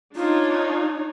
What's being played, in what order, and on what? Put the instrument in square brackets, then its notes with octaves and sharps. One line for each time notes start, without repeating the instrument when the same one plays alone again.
[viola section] D4 D#4 C#5 [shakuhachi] F4